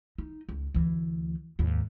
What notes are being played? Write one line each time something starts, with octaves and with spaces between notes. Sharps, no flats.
D#4
C#2
D2 E3
D#2 G#2